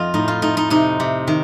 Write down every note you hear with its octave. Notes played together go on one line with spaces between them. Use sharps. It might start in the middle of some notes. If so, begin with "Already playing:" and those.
Already playing: F2 F4 D#5
A2 D#4
F4
A2 D#4
D#4
C3 D#4
C3
D#3